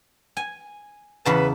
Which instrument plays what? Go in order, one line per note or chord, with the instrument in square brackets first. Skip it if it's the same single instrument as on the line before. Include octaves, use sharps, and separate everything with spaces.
[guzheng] G#5
[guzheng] E2 C#3 A5 [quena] B4